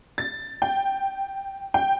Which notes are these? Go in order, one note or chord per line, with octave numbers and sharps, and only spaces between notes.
A6
G5
G5